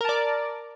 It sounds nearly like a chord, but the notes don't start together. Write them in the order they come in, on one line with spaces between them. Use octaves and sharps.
A#4 A5 D5